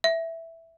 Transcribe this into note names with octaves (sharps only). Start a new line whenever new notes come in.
E5